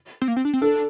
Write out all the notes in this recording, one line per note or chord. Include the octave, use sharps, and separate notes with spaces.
C4
A#3
C4
D4
C4
D4 A4